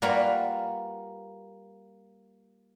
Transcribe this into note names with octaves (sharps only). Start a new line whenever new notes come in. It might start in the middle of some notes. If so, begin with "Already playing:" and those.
G3 A#3 F4 F#4 B4